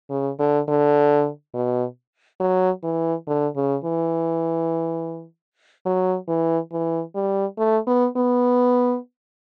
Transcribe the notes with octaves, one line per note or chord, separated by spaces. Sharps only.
C#3
D3
D3
B2
F#3
E3
D3
C#3
E3
F#3
E3
E3
G3
A3
B3
B3